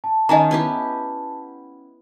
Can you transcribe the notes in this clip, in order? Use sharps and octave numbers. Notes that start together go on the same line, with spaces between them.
A5
D#3 C#4 D#4 D#5 G#5 A#5
B3 E4 G4